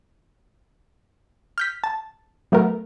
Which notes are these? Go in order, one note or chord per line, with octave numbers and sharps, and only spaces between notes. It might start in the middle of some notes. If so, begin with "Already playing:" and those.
F6 G6 B6
A5
F#3 A3 B3 A#4